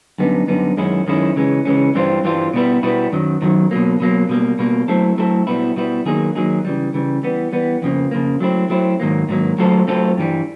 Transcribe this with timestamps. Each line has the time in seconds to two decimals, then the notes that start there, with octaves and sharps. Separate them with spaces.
0.18 F#2 D3 G3 B3 D#4
0.48 F#2 D3 G3 B3 D#4
0.77 F#2 D#3 G#3 C#4 E4
1.07 F#2 D#3 G#3 C#4 E4
1.36 C#3 E3 G#3 C#4
1.65 C#3 E3 G#3 C#4
1.95 G2 E3 G3 C4 F4
2.24 G2 E3 G3 C4 F4
2.54 B2 G3 B3 E4
2.83 B2 G3 B3 E4
3.12 F#2 D#3 F#3
3.42 F#2 D#3 F#3
3.71 B2 F#3 A#3
4.00 B2 F#3 A#3
4.29 B2 G3 A#3
4.59 B2 G3 A#3
4.88 F#3 A3 C4 E4 A4
5.18 F#3 A3 C4 E4 A4
5.47 B2 G3 B3 E4
5.76 B2 G3 B3 E4
6.06 D#3 F#3 A#3 D#4 G#4
6.35 D#3 F#3 A#3 D#4 G#4
6.65 C#3 E3 G3
6.94 C#3 E3 G3
7.23 E3 G3 B3
7.53 E3 G3 B3
7.82 F2 C#3 F3 A#3
8.11 F2 C#3 F3 A#3
8.41 F#3 A3 C4 E4
8.70 F#3 A3 C4 E4
9.00 G#2 D#3 F#3 A#3
9.29 G#2 D#3 F#3 A#3
9.58 F#3 A3 C4 F4 A4
9.88 F#3 A3 C4 F4 A4
10.17 G2 E3 G3